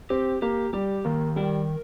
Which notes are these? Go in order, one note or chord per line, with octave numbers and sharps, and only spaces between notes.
C4 G4
A#3 G4
G3 G4
D#3 A#3
G3 A#4